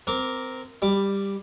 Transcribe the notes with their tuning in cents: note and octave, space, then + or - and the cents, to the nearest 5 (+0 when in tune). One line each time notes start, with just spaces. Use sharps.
C4 -20 A#4 +0 D6 -10
G3 +10 D6 +0